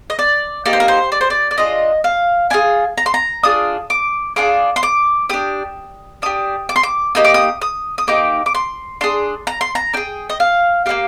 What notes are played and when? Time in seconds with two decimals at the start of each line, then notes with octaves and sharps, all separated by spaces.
0.10 D#5
0.19 D5
0.66 A#3 D#4 G4 D5
0.73 C5
0.80 A#4
0.88 C5
1.12 D5
1.21 C5
1.30 D5
1.51 D5
1.58 D4 F4 G#4 D#5
2.04 F5
2.50 D4 F4 G#4 G#5
2.98 A#5
3.06 C6
3.14 A#5
3.43 D4 F4 G#4 D#6
3.90 D6
4.36 D4 F4 G#4 D6
4.76 C6
4.83 D6
5.29 D4 G4 D#6
6.22 D4 G4 D#6
6.69 D6
6.76 C6
6.83 D6
7.15 A#3 D#4 G4 D#6
7.25 D6
7.34 D#6
7.62 D#6
7.98 D#6
8.07 A#3 D#4 G4 D6
8.46 D6
8.55 C6
9.01 D4 G#4 C6
9.47 A#5
9.61 C6
9.75 A#5
9.93 D4 G#4 G5
10.30 D#5
10.40 F5
10.86 A#3 D4 G4 F5